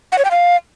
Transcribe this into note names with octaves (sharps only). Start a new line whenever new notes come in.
F#5
C#5
G5
F5